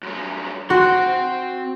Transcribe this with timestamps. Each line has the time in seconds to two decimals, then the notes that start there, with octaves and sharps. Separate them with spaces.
0.03 F#2 G3
0.70 C4 F#4 C6